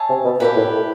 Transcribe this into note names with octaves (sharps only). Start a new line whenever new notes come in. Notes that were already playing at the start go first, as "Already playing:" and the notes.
Already playing: G#4 C#5 E5 A5
C3
B2
A#2 E4 G4 B4
A2